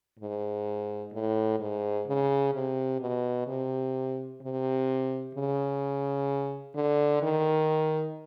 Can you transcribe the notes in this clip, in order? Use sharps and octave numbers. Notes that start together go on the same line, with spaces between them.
G#2
A2
G#2
C#3
C3
B2
C3
C3
C#3
D3
D#3